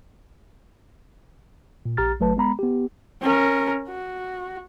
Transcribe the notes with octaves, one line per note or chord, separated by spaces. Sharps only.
A#2
A#1 G4 A#5 F6 A6
G1 F#3 A3 B4 A5
G#3 B3 A#5 B5
B3 G4
C#4 A#4
F#4